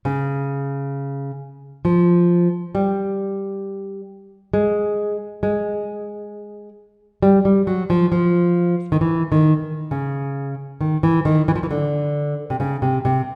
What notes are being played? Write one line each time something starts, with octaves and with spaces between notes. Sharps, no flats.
C#3
F3
G3
G#3
G#3
G3
G3
F#3
F3
F3
D#3
E3
D#3
C#3
D#3
E3
D#3
E3
F3
E3
D3
C3
C#3
C3
C3